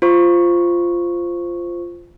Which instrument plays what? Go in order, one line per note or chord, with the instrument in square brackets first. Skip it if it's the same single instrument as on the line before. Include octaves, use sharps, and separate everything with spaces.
[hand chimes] F4 C5 C#6